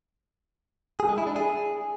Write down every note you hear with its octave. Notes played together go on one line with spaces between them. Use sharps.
G#4
G#3
E4
D4
G#4